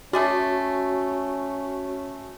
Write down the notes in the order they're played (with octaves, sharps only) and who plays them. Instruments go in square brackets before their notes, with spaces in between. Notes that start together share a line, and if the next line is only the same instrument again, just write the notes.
[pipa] A3 G#4 D5 [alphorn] C#4 [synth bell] F#4